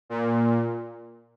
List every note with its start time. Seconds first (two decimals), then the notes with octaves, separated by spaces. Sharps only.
0.09 A#2